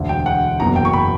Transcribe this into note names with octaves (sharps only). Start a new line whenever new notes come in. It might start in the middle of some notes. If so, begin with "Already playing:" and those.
Already playing: E1 D2 D3
G5
F#5
F#1 E2 B2 A#3 A#5
G5
C#6
B5